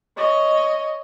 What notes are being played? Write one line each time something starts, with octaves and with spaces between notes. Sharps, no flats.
C#5 D#5